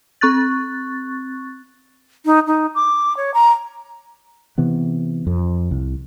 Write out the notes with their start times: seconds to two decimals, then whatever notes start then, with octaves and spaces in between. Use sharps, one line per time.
0.21 C4 C#6 F#6 A6
2.25 D#4
2.47 D#4
2.75 D6
3.17 C#5
3.34 A#5
4.58 C3 E3 B3
5.27 F2
5.71 C2